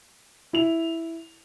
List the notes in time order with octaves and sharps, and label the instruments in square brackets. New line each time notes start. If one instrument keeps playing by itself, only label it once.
[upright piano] E4 F7